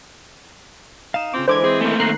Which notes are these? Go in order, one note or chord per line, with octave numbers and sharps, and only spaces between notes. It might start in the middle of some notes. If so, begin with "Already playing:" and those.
D#4 F5 E7
C#3 C4 F4 D6
D3 E3 G#3 E4 C5 D6 G#6
C4 G#4
A3 A#3
D#3 A#5 F#6 C7